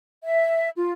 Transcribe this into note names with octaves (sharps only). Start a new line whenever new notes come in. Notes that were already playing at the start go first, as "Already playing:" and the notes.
E5
F4